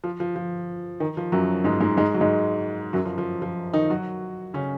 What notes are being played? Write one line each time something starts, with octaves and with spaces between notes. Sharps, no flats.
F3
F3
F3
D#3
F3
F#2 F#3
G#2 G#3
G#2 G#3
G#2 G#3
F#3
G#2 G#3
F#2 F#3
F3
F3
F3
D#3 D#4
F#3 F#4
C#3 C#4